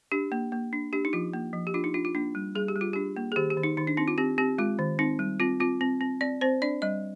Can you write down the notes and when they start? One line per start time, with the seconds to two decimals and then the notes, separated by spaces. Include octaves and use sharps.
0.12 D4 G4
0.32 A#3
0.52 A#3
0.73 D4
0.93 D4 G4
1.05 D#4
1.13 F3 F4
1.33 A#3
1.53 F3
1.67 G4
1.74 D4 F4
1.84 D#4
1.94 D4 F4
2.05 F4
2.15 A#3 D4
2.35 G3
2.55 G3 G#4
2.68 G4
2.76 G3
2.81 F4
2.93 D4 G4
3.16 A#3
3.32 G#4
3.36 D#3 G4
3.50 G4
3.57 D#3
3.63 D#4
3.77 D#3 D#4
3.87 D4
3.97 C4 D#4
4.08 F4
4.18 C4 G4
4.38 C4 G4
4.58 G#3 F4
4.79 D#3
4.99 C4 D#4
5.19 G3
5.40 C4 F4
5.60 C4 F4
5.81 C4
6.01 C4
6.21 C4 D5
6.41 C4 C5
6.62 D4 D5
6.82 G3 D#5